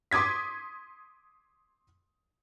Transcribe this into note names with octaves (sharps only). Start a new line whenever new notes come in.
C6 D6 D#6 G#6 B6